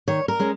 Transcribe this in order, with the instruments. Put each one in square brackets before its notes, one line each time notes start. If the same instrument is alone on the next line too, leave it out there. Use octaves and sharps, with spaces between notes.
[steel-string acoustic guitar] D#3 C#5
A#4
G#3 C#4